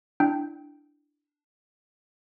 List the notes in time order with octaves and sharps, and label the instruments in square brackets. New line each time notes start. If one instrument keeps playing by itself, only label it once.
[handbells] D4 E4 G5